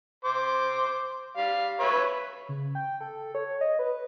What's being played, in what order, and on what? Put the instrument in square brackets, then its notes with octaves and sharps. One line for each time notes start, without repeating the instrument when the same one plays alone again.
[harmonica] C5 D6
G3 F5
B4 C#5 E5
[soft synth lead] C#3
G5
A4
C#5
D#5
B4